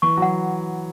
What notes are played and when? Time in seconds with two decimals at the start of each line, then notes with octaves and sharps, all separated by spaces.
0.02 E3 C#6
0.17 F#3 F#5